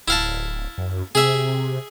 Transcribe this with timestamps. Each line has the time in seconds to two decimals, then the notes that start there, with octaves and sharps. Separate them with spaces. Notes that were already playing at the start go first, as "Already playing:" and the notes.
0.08 D1 E4 F5 A5
0.78 F#2
1.15 C3 G#4 E5